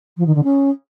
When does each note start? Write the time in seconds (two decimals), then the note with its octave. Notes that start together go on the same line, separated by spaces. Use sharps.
0.18 F3
0.26 D#3
0.35 D3
0.44 C#4